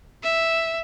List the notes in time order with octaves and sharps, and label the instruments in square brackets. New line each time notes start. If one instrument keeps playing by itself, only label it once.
[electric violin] E5